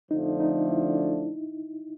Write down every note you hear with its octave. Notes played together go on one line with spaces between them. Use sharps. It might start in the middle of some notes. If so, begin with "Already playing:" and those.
F2 D3 F3 A3 D4 D#4
D#4
E4